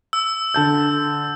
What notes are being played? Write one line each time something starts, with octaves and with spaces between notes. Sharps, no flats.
E6
D3 A5 G6